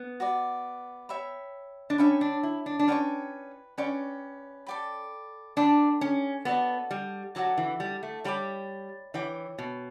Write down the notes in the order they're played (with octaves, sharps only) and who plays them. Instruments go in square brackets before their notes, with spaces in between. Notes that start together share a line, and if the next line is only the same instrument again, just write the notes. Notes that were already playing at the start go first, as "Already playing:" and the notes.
Already playing: [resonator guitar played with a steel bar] B3
[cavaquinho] F#4 B4 D5
C#5 E5 G5 B5
[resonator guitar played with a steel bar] D4
[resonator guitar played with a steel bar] C#4 [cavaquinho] C#5 E5 G5 B5
[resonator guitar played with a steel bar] D4
E4
D4
D4
[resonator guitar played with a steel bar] C#4 [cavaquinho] B4 D5 G5 C#6
[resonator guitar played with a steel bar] C#4 [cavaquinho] B4 D5 G5 C#6
[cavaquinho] A4 D5 G5 B5
[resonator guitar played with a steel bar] D4 [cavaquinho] A4 D5 G5 B5
[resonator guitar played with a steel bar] C#4
[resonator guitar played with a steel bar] B3 [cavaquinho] F#4 A4 D5 A5
[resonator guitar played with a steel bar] G3
[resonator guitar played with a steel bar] F#3 [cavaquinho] F#4 A4 D5 A5
[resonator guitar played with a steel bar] E3
G3
A3
[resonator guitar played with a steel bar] G3 [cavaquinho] C#5 G5 B5 D6
[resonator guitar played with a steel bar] E3 [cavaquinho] C#5 G5 B5 D6
[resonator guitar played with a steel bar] B2